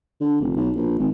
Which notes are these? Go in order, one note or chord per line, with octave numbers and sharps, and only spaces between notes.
D3
F1
B1
A#1
G#1